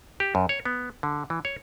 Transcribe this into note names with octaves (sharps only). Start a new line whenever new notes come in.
G4
F#2
C#5
B3
D3
E3
C#5